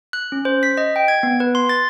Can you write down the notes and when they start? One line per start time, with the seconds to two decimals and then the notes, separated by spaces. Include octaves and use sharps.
0.13 F#6
0.32 C#4
0.45 C5
0.63 B6
0.77 D#5
0.96 G5
1.08 G#6
1.23 B3
1.40 B4
1.55 C6
1.69 A6